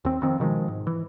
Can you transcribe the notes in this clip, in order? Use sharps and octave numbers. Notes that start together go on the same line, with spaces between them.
D#2 C4
F1 F2 D#3 C4
B2 D#3 F3 G#3
G#2
E3